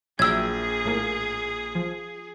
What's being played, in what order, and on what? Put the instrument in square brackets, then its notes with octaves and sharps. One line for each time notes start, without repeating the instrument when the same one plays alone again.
[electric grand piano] A#1 [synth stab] F#3 E5 G5 [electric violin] G#4 [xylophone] E6 G#6
[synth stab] A2 A3 A#3
F3